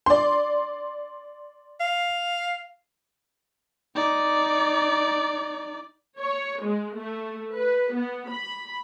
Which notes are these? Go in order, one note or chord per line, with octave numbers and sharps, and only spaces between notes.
D5 C6
F5
D#4 D5
C#5
G#3
A3
B4
B3
B5